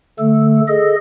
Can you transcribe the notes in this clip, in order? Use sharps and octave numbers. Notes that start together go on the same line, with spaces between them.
D3 A3 A4
G#4 A4 D#5